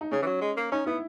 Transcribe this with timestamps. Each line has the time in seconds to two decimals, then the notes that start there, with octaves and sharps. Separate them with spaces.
0.01 D#4
0.11 C#3 C#4
0.22 E3
0.26 F#3
0.41 G#3
0.57 A#3
0.72 C#4 D#4
0.86 B3 E4